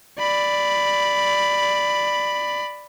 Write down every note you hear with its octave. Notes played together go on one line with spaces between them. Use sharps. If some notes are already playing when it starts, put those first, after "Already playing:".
D5 B5